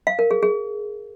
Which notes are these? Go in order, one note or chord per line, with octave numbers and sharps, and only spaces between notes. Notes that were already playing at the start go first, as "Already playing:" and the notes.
F5
A#4
G#4
G#4